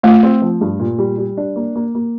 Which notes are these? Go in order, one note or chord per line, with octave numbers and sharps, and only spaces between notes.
A3 F4
C4
F3
G2
A#2
G3
G3
D4
A#3
A#3
A#3